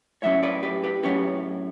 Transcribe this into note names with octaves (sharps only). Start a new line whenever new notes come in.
A2 F#3 C#4 C#5 E5
B4 D5
G4 B4
G4 B4
A2 F#3 C#4 G4 B4